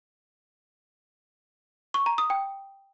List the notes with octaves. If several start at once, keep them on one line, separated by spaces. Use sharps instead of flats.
C#6
A#5
D#6
G5